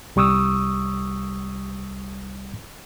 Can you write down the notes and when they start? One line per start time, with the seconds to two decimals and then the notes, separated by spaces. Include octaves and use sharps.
0.16 C2 G3 C#6 D#6 E6